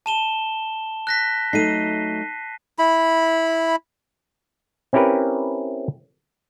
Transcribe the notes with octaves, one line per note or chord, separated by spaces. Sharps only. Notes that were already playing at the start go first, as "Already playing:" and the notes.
A5 E7 G7
F#6 A#6 B6
F#3 A3 D#4 C7 D#7
E4 B5
C4 C#4 E4 G4 A#4 B4